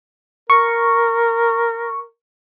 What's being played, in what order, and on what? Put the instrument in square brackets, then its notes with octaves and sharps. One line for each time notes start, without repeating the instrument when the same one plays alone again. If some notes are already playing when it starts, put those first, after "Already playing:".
[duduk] A#4 [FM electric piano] C#6